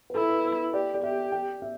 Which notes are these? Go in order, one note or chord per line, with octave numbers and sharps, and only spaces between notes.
B4
E4 A4
B4
B4
G4 D5
D5
G4 E5
G5
E5